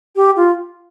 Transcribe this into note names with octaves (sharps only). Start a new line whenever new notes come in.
G4
F4